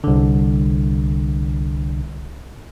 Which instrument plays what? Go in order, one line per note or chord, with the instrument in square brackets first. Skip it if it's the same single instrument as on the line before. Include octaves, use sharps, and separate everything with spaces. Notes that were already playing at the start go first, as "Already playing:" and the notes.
[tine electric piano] C2 D3